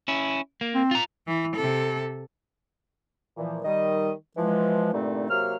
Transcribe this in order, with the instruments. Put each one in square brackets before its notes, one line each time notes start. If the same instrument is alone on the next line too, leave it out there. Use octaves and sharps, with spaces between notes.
[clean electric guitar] C#4 E4
A#3
[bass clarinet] C4
[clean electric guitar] F4 A#5
[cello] E3
C3 A4
[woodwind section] A#2 E3 F3
D#3 G3 D#5
E3 F3 G#3
G2 A#2 D3 A3 C4 D#4
C3 F#3 A#3 F6